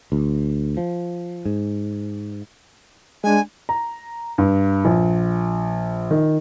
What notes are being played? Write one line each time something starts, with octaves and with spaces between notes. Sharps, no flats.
D2
F3
G#2
G#3 D4 G#5
A#5
G2
A#1
D#3